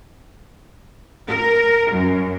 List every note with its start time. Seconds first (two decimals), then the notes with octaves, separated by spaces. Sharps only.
1.29 A#4
1.92 F#2